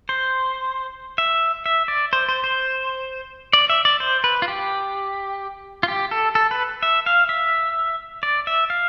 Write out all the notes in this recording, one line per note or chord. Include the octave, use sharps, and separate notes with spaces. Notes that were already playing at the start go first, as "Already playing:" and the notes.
C5
E5
E5
D5
C5
C5
C5
D5
E5
D5
C5
B4
F4
G4
F4
G4
A4
A4
B4
E5
F5
E5
D5
E5
F5